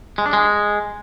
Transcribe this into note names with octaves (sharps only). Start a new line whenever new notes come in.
G#3
D4
G#3